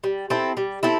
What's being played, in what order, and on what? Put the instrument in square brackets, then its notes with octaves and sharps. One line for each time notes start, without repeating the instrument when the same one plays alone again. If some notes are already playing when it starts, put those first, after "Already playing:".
[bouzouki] G3
C4 E4 A4
G3
C4 E4 A4